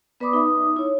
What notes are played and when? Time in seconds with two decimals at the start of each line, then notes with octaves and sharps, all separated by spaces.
0.20 B3 B4 D5 B5 D6 D#6
0.33 D#4 E5 D#6
0.76 E4 C#5